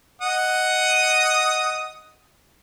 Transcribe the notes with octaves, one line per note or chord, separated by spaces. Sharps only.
D#5 F#5 D#6